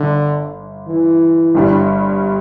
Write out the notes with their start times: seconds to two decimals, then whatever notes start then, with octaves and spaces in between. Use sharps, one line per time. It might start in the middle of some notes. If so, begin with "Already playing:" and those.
Already playing: G1 D3
0.87 E3
1.55 G1 G2 G3